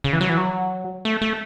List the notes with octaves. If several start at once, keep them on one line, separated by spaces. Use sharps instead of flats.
C#3
E3
F#3
E3
F#3
A3
A3